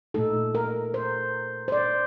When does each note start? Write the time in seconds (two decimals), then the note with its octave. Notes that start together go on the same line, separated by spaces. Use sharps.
0.14 A#2 A3 D#4 A4
0.55 A#4
0.94 C5
1.68 C5
1.72 D5